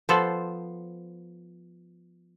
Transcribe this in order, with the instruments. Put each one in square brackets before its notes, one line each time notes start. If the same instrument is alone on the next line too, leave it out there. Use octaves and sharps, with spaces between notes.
[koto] F3 B3 A4 C5